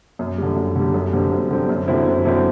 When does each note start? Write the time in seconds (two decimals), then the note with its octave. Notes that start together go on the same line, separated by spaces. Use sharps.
0.19 F#2
0.38 D3 G3
0.56 F#2
0.76 D3 G3
0.94 F#2
1.13 D3 G3 C4
1.32 F#2
1.51 D3 G3 C4
1.69 F#2
1.88 D3 F#3 C4 E4
2.07 F#2
2.25 D3 F#3 C4 E4